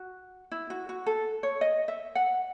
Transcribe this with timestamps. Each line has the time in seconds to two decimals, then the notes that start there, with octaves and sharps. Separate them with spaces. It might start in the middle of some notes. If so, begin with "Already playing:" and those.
Already playing: F#4
0.52 E4
0.70 F#4
0.89 F#4
1.06 A4
1.43 C#5
1.61 D#5
1.88 E5
2.15 F#5